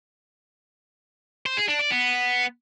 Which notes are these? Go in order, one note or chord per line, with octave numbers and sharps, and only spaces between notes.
C5
G#4
D4
D5
B3